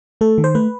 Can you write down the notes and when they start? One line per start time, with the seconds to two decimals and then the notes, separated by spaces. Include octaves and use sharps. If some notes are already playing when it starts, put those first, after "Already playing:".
0.21 A3 A4
0.38 D#3
0.44 C5
0.55 A3 B4